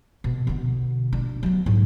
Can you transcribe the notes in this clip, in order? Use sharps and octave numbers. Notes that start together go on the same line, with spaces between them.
B2
B2 D3
D4
F#3 B3
G#2